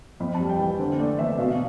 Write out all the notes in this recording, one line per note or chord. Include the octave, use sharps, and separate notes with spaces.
F2 B5
A5
G3
G5
E3
D3 C5
A3 D5
E2 E5
B2 F5